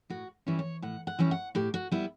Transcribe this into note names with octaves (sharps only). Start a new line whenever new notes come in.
A2 F#4
E3 G3 C#4 E4
C#5
A2 F#5
F#5
E3 G3 C#4 E4
F#5
A2 G4
F#4
G3 B3 E4